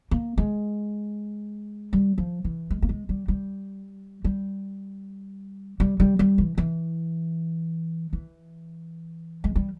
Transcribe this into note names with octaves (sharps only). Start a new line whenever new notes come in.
A#3
G#3
G3
F3
E3
G#3
A#3
G#3
G3
G3
G3
G3
G3
G3
E3
E3
E3
G#3
G3